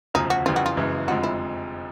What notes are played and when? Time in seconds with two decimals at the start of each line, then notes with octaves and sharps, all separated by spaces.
0.14 E1 D2 C#3 F3 D#4
0.30 F#4
0.45 F2 C#3 E3 G3 C4 F4
0.56 F#4
0.66 F4
0.76 F#1 F#2 C#3 E3 G#3
1.07 F1 F2 D3 F3 G#3 F#4
1.23 E4